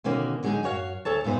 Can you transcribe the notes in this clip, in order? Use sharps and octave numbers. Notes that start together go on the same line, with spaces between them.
B2 D3 D#3 A#3 C#4 F#4
D3 F#3 G#3 C#4 D#4 G#4
F#2 F#4 C#5 F5
D2 A4 C#5 A5
F#2 A#2 B3 D#4 C5